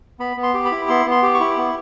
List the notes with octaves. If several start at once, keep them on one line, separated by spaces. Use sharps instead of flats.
B3 B5
B3
C6
G4
B5
E4
B3 C6
B3
C6
G4
C#6
E4
B3